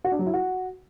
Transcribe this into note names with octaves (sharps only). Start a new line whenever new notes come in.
F#4
D4
F#3
E4
F#4